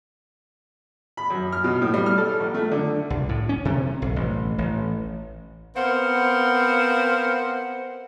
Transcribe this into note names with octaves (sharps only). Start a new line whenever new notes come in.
B5
F#2
F6
B2
A2
G3
F6
A4
A#1
A3
D3
C2
A2
C#4
C3
B1
A1
A1
B3 C4 A#4 C5 F5 F#5